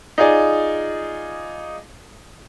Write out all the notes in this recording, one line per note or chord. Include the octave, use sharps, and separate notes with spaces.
D#4 F4 G#4 D5